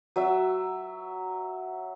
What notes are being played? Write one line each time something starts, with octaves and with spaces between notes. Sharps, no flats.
F#3 E5